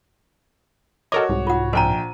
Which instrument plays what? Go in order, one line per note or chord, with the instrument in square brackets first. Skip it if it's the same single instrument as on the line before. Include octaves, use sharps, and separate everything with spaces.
[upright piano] F#4 C#5 [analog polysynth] A4 A#4 D#5 [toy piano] D6
[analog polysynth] C2 G#2
[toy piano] F4 F#5
[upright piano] A#1 G5 D#7 [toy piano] C5 A#5